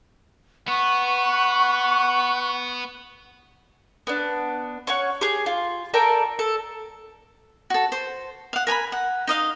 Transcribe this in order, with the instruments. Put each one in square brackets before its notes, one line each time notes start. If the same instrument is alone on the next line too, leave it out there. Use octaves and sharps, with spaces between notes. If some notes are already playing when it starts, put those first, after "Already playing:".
[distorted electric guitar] B3 [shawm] F#5 [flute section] C#6
[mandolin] B3 D4
C#4 C#5 F#5
G4 G#4
F4
A4 A#4 D5 G5
A4
[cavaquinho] F#4 A4
C5
F5 F#5
A#4 G#5 A#5 B5
F#5
D#4 D#5 F5